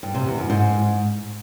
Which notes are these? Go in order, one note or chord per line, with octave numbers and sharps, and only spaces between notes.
G2
C3
E2
F#2
G#2